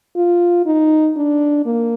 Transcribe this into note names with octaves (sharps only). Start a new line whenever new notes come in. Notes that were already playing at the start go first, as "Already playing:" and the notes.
F4
D#4
D4
A#3